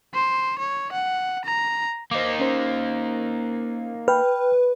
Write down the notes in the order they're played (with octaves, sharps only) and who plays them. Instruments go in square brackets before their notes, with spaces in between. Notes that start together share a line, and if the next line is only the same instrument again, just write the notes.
[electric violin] C5
C#5
F#5
A#5
[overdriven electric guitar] A#3 D#4 [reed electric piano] C5 D6
[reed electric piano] C#4 C5
[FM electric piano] B4 [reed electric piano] G5 F6